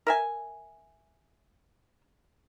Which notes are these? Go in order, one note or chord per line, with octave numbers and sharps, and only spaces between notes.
A#4 E5 G#5